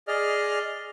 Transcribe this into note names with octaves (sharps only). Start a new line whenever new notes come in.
G#4 D5 D#5 F6